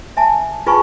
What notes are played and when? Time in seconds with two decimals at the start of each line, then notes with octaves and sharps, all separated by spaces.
0.17 E5 G#5 A5
0.67 F4 G#4 B4 G#5 A5 C#6